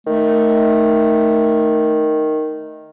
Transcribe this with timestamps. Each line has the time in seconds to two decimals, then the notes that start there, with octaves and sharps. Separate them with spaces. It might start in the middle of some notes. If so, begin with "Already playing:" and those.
0.07 D#3 A3